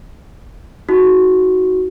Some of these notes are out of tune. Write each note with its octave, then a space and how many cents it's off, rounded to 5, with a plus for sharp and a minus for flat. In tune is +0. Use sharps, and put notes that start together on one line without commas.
D#4 +30 F#4 +0